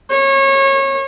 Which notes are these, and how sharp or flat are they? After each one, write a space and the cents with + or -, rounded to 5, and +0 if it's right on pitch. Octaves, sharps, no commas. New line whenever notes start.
C#5 -25